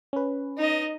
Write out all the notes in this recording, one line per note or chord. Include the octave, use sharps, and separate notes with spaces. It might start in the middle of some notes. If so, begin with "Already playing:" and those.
C#4 B4
D#4 D#5